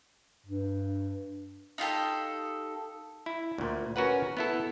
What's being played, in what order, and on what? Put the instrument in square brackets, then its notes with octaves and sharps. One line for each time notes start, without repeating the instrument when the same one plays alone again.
[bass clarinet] G2
[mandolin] D#4 F4 G4 A4
[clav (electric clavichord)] E4
D2 A#2
C#4 F#4 A#4 B4 F#5
B3 E4 A4